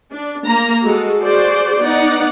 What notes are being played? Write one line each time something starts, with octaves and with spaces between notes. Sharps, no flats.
D4
A#3 A#5
G#3 F#4 A4
F#4 G#4 C5 D5
B3 D#4 D5 F#5